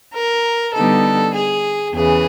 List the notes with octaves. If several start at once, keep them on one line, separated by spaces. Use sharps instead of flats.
A#4
D3 G3 B3 D#4 A4
G#4
E2 C#3 E3 G#4